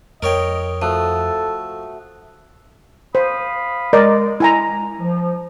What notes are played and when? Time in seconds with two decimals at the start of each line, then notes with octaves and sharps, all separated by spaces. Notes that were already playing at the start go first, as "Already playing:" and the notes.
0.22 F2 A#4 C#5 D#5 G5
0.82 F3 A3 F#4 A4 D#6
3.15 C5 F5 B5 D#6
3.93 G#3 A#4 D5 D#5
4.40 E4 G#5 A#5
5.00 F3